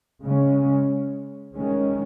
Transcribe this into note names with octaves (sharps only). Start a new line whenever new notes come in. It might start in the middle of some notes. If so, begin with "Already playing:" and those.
C#3 G#3 C#4
D#3 G#3 C#4